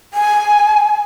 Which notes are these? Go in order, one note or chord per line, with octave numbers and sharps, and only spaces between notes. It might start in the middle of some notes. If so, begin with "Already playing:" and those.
G#5